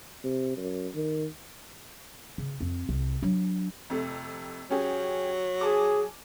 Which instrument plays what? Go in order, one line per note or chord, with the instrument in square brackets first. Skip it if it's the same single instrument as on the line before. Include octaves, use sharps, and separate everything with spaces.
[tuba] C3
F#2
D#3
[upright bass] C#3
F2 C4
C2
F#3 D4
[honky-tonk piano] F2 C3 A3
[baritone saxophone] F#3 [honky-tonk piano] C#4 G4 G#4
[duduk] G#4 [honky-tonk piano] G#5 A5 D6